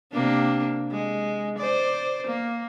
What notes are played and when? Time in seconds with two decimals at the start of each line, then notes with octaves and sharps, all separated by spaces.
0.12 C3 A#3 D4
0.92 G#3
1.58 C5 D5
2.27 A#3